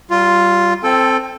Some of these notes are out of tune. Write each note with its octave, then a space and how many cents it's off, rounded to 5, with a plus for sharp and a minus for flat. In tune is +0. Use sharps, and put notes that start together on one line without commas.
G3 -30 F4 +0
C4 +0 A4 +0 G5 +35